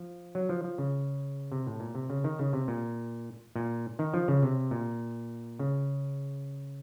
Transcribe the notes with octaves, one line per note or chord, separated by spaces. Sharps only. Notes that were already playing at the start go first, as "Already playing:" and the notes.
Already playing: F3
F#3
F3
F3
C#3
C3
A2
A#2
C3
C#3
D#3
C#3
C3
A#2
A#2
D#3
F3
C#3
C3
A#2
C#3